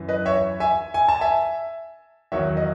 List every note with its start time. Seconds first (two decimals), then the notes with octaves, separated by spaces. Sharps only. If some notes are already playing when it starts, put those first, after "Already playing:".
Already playing: F#2 E3
0.08 B4 D#5
0.26 C#5 E5
0.60 E5 G#5
0.94 G#5
1.09 A5
1.21 E5 G#5
2.32 E2 D#3 F#3 C#5 E5
2.57 D#5